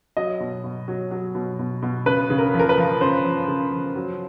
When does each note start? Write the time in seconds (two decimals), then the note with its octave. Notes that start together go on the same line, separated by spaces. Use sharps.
0.17 F#3 D#5
0.40 B2
0.64 B2
0.88 F#3
1.11 F#3
1.35 B2
1.59 B2
1.82 B2
2.06 C#3 B4
2.30 C#3
2.38 A#4
2.54 F3
2.59 A#4
2.69 B4
2.78 F3
3.01 C#3 C5
3.25 F3
3.48 C#3
3.72 F3
3.96 F#3